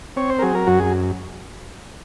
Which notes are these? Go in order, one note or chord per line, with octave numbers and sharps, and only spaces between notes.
C4 C#5
C5
A#4
F#3 G#4
A#4
F#2 F#4
G#4